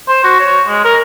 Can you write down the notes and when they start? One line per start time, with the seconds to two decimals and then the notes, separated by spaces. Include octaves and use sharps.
0.08 C5
0.24 F#4
0.40 C#5
0.67 G#3
0.84 A#4